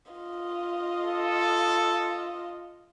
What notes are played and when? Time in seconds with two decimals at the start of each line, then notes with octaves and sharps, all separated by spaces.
0.12 F4 D#5
1.03 A4